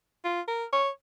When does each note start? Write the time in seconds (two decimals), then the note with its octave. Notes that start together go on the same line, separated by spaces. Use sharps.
0.24 F4
0.48 A#4
0.72 C#5